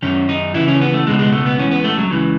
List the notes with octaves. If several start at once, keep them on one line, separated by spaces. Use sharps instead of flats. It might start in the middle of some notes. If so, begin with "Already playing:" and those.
F#2 D#3 C#4
D#4
D#2 C#3 E3 E4
C#4
B3
A3
C#2 B2 G#3
G#3
A3
B3
C#2 C#3 E3 C#4
B3
A3
F#3
C#2 C#3 E3